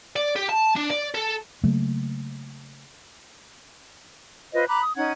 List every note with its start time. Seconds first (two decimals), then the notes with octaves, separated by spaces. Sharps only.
0.16 D5
0.36 G4
0.49 A5
0.77 D4
0.91 D5
1.15 A4
1.64 C#3 F#3 A3 A#3
4.53 F4 B4 C5 D#5
4.68 A#5 B5 D6 F#6
4.83 D#6
4.96 C#4 D#4 F#5 G#6